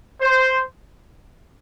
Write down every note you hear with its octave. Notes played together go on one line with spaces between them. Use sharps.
C5